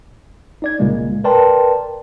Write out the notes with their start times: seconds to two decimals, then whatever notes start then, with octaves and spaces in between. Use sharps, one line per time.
0.62 D#4 D5 G#6
0.79 C2 A#2 C#3 G#3 A#3
1.24 A#4 B4 D5 G5 A5 C6